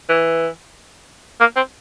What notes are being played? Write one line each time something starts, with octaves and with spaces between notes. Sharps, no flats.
E3
A#3
C4